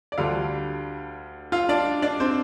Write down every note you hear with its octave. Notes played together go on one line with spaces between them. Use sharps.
D5
D2 D3 G3 F4 F5
F4 F5
D4 D5
D4 D5
C4 C5